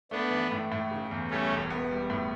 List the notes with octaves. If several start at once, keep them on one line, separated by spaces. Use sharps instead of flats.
A3 B3 D4
E3
A2
A2
C#3
E2
G3 A3 C#4
E1
B3
G3
A2